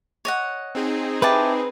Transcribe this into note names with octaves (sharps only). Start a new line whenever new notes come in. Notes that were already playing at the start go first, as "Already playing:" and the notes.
C#5 D#5 F#5
C4 D#4 G#4
E4 G4 B4 A5